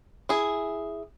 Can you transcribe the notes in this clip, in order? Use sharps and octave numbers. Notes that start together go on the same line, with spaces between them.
E4 G#4